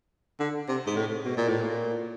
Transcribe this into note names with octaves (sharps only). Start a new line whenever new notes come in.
D3
C3
G#2
A2
B2
A#2
A2
A#2